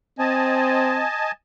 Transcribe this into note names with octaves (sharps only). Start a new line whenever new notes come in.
C4 D#5 G#5 A5